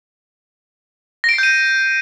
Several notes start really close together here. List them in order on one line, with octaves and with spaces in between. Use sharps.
A#6 D7 C7 G6 D#7